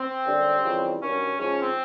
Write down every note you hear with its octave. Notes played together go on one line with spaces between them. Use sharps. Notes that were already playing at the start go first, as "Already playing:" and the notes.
Already playing: C4
F#2 D3 G3
F2 C#3 E3 G3
G2 D#3 F#3 C#4
G#2 F3 G#3 C#4
C4